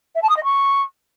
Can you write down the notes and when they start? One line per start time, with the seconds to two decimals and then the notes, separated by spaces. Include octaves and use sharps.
0.15 E5
0.22 A5
0.30 D#6
0.37 D#5
0.44 C#6